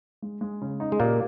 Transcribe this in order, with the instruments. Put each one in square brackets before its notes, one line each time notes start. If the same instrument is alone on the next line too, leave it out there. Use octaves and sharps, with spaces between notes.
[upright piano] G#3
G#3
C#3
D#4
[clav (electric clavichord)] G#3
[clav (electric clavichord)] A#2 A#3 [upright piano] G4